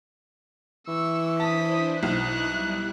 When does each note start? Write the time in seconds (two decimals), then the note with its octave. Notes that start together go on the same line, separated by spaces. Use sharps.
0.88 E3 C#6 E6
1.40 D4 E4 C5 A5 D#6 B6
2.03 B1 E4 C#6 D#6 F#6
2.47 G3 E4